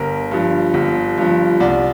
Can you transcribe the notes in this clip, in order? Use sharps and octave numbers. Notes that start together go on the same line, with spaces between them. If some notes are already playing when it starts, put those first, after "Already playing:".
Already playing: G1 A#4
G2 F3
G1
G2 F3
C2 D5